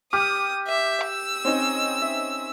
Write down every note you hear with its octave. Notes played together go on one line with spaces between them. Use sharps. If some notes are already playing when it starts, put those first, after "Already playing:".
G4 D6 D#6 F6
E5
E6
C4 C#4 D#4
E5